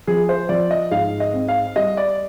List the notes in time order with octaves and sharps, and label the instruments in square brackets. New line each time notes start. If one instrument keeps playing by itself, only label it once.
[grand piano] F3 [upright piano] G#4
[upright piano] C5
[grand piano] F3 [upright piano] D5
[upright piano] D#5
[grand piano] G#2 [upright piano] F5
[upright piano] D#5
[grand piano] C4
[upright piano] F5
[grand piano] G3 [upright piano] D#5
[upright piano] D5